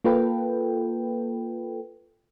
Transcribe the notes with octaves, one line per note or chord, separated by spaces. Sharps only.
A#3 F4 A4 B4 G5